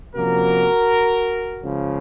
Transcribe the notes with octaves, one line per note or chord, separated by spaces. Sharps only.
C3 F3 A#3 C#4 F#4 A#4
C#2 C#3 F3